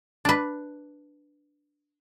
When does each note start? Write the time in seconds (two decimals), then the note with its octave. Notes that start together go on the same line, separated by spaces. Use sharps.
0.25 D4 B4